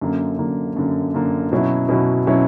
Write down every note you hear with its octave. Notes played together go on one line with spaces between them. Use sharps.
F#2 D3 A#3
F#2 D3 A#3
F#2 D3 A#3
F#2 D3 A#3
B2 F#3 C#4 E4
B2 F#3 C#4 E4
B2 F#3 C#4 E4